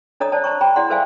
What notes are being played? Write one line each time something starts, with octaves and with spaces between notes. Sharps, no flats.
D4 A4 C#5 D#5 A#5 D#6
C5 D5 A5
C5 A#5 C#6
G#4 G5 A#5 B5
E4 G#4 D5 F#5 C6
A4 B4 C5 E5 F5 G#5